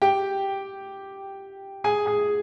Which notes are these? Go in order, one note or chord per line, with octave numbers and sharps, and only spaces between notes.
G4 G5
G#4 G#5
G#4 G#5